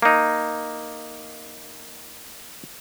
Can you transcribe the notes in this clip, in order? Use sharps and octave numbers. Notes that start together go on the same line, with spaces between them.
A#3 D#4